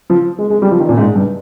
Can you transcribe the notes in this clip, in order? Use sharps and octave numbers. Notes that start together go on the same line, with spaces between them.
F3
G#3
G#3
G3
F3
D#3
A#2
G#2
G2